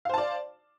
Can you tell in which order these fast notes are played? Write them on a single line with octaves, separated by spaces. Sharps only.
F5 C5 A5 D5